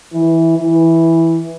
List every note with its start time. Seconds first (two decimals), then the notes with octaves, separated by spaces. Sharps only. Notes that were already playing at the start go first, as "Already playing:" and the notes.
0.13 E3
0.58 E3